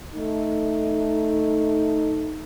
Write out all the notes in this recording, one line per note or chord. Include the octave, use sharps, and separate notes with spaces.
A3 D#4